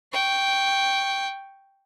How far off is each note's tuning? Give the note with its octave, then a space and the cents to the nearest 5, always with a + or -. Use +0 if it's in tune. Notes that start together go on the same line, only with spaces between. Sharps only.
G5 +0 C#6 +0